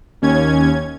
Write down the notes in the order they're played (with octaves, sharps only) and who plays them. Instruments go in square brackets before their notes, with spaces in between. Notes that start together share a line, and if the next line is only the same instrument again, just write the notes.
[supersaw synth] D#2 C#4 G#6